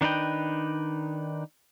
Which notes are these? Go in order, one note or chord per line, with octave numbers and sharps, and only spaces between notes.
D#3 D4 D#4 B4 G5